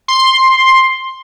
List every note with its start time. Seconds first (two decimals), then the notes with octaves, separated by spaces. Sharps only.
0.08 C6